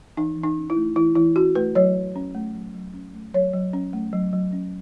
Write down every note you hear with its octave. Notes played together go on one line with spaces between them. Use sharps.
E3 D#4
E3
D#4
C#4
E4
A3
E3 E4
E3 E4
C#4 F#4
A3 B4
F#3 C#5
F#3
C#4
A3
F#3
F#3
C#4
A3
F#3 C#5
F#3
C#4
A3
F#3
F#3
C#4